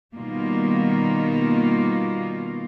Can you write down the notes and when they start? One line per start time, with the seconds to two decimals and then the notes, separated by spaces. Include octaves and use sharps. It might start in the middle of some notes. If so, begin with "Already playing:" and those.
0.14 B2 D#3 G3 A#3 F4